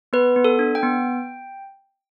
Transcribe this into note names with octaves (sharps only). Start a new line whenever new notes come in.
B3 B4
B3
A4
D4
G5
B3